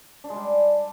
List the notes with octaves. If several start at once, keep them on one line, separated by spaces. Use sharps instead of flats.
D4
G#3
G3